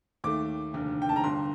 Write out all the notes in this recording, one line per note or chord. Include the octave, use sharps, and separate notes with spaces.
D#2 D#3 A3 D6
F1 D#2 D3
G5
A5
A#5
G1 G2 D3 C6